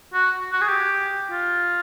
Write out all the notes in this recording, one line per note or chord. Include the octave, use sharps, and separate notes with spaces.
F#4
F#4
G#4
G4
F4